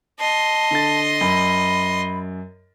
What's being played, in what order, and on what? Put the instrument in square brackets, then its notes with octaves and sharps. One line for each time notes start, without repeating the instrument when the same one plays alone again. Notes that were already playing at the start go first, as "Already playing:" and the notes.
[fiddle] D#5 C6 [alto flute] A5
[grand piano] D3 A6
[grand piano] F#2 [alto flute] B5